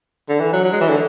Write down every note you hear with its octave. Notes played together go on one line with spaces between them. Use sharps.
D3
E3
F#3
F#3
G#3
E3
D3